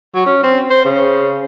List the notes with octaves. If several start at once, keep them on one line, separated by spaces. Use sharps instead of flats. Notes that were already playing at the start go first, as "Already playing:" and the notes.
F#3
C#4
C4
C5
C#3